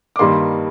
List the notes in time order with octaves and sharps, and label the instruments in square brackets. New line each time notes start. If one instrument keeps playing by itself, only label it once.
[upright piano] D6
G2 D#3 G3 A#3 C6